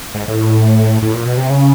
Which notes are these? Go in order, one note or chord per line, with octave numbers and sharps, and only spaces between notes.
G#2
A2
A2
A#2
B2
C3
C#3